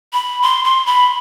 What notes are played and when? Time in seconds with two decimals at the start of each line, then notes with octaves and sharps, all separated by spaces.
0.13 B5
0.42 C6
0.64 C6
0.86 B5